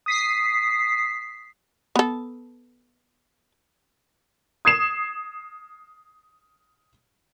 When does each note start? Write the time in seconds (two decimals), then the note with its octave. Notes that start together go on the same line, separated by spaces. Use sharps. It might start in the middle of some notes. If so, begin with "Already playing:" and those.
0.06 D#6 B6 C7
1.96 B3 A4
4.65 D#6 G#6 C7 E7